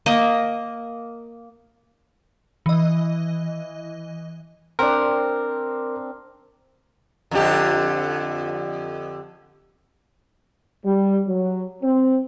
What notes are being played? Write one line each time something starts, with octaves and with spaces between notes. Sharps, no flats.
A#3 D#5
E3 D#5
C4 D4 A#4
F2 D3 G4
G3
F#3
C4